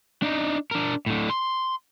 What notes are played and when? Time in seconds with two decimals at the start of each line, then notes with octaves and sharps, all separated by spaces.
0.22 D4 D#4
0.71 D4 A#4
1.06 A2 D3
1.30 C6